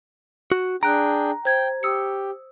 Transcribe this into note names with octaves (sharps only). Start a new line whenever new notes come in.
F#4
D4 G#4 G5 A#5 F#6 D7
C5 G5 G#6
G4 D#6 E6 C#7